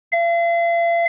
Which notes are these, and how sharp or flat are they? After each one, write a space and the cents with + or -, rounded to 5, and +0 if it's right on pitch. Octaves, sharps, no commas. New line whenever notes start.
F5 -45